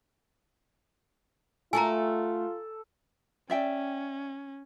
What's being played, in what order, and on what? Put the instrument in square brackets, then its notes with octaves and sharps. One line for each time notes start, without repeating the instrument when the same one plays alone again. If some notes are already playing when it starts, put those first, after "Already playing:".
[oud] A3 F#4 A#4 [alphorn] F4 [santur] A4 [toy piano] G#5 A#5
[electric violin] C#4 [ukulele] D5 E5 G5